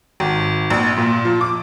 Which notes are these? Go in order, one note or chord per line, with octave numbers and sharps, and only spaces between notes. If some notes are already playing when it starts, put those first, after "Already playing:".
G#1
A#1
A#2
F3
D6